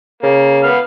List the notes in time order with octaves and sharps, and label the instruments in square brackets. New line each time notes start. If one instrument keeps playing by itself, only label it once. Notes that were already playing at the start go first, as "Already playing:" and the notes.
[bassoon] C#3 [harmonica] A#3
[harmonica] B3 F5